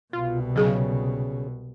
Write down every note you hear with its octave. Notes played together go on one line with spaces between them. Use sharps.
C2 B2 F4
C#3 F#3 G#4